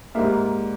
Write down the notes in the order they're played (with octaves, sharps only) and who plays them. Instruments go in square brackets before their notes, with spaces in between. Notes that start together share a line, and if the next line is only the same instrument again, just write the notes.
[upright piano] G#2 G3 A#3 E5